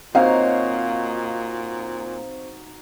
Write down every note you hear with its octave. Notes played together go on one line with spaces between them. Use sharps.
A#2 C4 D#4 F#4 C#5 F5